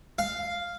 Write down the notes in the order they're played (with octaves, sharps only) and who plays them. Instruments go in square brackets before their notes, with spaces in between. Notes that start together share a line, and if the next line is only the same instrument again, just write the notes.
[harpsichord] F5